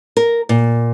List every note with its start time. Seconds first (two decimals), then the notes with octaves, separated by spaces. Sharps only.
0.17 A#4
0.49 A#2